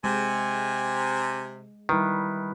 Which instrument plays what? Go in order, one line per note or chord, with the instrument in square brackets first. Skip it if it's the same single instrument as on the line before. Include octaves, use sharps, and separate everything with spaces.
[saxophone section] C3 [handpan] G#3 [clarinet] G#5
[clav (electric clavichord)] D#3 [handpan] G3 E4 B4